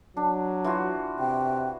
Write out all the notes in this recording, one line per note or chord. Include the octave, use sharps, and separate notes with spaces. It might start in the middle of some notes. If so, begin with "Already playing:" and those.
F#3 D4
E3 F4 F#4
C3 G5